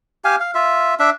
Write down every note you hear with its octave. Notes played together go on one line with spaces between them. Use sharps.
G4 F5 G#5
F5
F4 E5
D4 E5